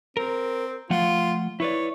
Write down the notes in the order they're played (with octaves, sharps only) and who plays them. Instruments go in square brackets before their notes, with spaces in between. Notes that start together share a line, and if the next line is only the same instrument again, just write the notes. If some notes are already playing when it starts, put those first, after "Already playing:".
[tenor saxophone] C4 [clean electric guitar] A#4
[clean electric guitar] F3 A3 F#5 [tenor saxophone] F4
[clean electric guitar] E4 B4 D5 [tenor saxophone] C#5